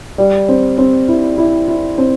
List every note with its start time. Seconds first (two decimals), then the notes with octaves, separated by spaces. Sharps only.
0.18 G3
0.49 C4
0.78 C4
1.08 E4
1.38 E4
1.68 E4
1.98 C4